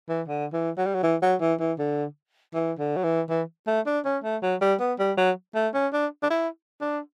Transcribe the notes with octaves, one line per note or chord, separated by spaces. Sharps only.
E3
D3
E3
F#3
G3
F#3
E3
F#3
E3
E3
D3
E3
D3
F#3
E3
E3
A3
D4
C#4
A3
F#3
G3
B3
G3
F#3
A3
C#4
D4
D4
E4
D4